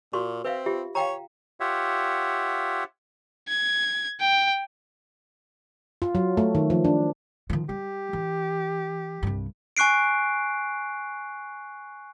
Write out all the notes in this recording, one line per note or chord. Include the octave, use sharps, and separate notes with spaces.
A#2 F#4 C6 C#6
C4 B4 E5 F5
F4 G4 E5
C#5 F5 G5 A#5
F4 G4 C#5 E5 F#5
G#6
G5
F4
F#3
A3
D#3
F3
D4
D#3 F3
G3 G4
E3
C2 G2
G#5 C#6 F#6 C7 D7